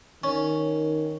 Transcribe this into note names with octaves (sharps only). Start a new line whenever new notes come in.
D#3 C#4